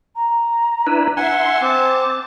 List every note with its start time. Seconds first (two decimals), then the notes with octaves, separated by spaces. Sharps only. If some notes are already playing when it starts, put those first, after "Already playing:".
0.16 A#5
0.87 D4 E4 B4
1.17 E5 F#5 G#5 C6
1.62 C4 A5 D6